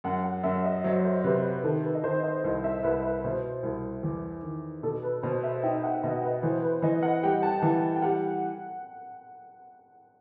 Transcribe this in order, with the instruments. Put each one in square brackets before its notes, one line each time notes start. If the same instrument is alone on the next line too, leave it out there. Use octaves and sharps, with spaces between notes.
[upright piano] F#2 [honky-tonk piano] F#5
[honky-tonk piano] F#5
[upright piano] F#2 [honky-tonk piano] E5
[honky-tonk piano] D#5
[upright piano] F#3 [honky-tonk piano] C5
[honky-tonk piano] C5
[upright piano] C3 [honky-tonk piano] B4
[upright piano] D#3 [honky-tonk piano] A4
[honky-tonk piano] B4
D#5
[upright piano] D#3 [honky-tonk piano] C5
[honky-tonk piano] D#5
[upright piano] C2
[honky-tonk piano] E5
[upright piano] C2 [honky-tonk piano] B4
[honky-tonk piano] B4
[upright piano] B2 [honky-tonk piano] C5
[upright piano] C2
E2
D#3
[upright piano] B2 [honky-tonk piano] A4
[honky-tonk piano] B4
[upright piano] B2 [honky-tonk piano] C5
[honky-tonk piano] E5
[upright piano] D#4 [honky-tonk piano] G5
[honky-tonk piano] F#5
[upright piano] B2 [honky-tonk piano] D#5
[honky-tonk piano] B4
[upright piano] E3 [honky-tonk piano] C5
[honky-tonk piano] B4
[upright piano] E3 [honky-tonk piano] D#5
[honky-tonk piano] F#5
[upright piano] G3 [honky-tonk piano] G5
[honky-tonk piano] A5
[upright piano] E3 [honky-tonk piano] A5
[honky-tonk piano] G5
[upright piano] G3 [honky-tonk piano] F#5